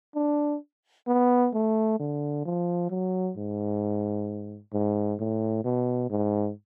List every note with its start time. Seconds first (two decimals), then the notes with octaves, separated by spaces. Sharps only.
0.16 D4
1.08 B3
1.54 A3
2.00 D3
2.45 F3
2.90 F#3
3.37 G#2
4.73 G#2
5.20 A2
5.64 B2
6.10 G#2